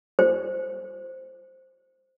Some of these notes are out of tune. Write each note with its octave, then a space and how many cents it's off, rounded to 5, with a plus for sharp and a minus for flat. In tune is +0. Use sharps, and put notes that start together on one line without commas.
C5 +0